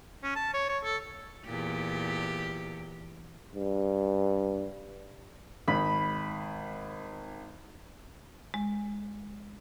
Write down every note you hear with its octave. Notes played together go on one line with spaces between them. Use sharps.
C#4
A5
C#5
C#5
A4
E2 A#2 G4
G2
G#1 B5
G#3